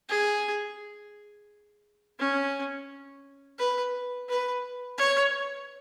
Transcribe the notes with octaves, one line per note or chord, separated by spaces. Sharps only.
G#4
C#4
B4
B4
C#5